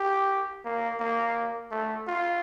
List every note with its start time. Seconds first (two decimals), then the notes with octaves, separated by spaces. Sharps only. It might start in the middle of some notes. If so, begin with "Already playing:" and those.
Already playing: G4
0.65 A#3
1.00 A#3
1.71 A3
2.07 F4